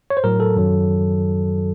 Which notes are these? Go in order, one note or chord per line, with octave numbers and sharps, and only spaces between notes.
C#5
C5
A2 F#3 A#4
A4
F#2 D#3 F#3